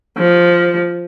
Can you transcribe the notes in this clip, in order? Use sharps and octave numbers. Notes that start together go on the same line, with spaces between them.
F3